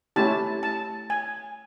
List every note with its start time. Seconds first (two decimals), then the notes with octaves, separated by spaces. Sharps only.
0.16 A3 C#4 E4 G4 A5
0.63 A5
1.10 G#5